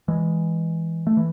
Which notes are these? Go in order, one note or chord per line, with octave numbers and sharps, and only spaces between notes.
E3 G#3
A3
E3